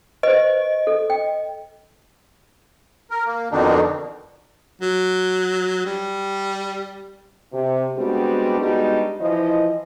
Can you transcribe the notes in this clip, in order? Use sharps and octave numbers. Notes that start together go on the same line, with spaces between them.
B4 C5 D#5
A4
G5
A#4
A#3
F2 B2 D3 D#3 D4 D#4
F#3
G3
C3
G3 G#3 B3 C4 D4 F#4
G3 G#3 B3 D4 D#4 F#4
E3 F3 E4 D#5